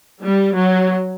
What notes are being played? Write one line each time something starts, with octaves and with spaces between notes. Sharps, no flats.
G3
F#3